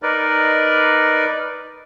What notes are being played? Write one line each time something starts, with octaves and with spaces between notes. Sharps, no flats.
D#4 A#4 B4 D5